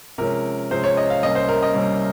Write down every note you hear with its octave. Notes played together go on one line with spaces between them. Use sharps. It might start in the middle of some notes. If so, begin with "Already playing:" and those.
C3 F3 G#3 C#4 A#4
C3 F3 G#3 C#4 C5
C#5
D#5
F5
C2 C3 G3 A#3 C#4 D#5
C5
A#4
D#5
C2 C3 G3 A#3 C#4